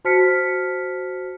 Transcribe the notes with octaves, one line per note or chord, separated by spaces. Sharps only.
F#4 C5 A5 F6 B6 C#7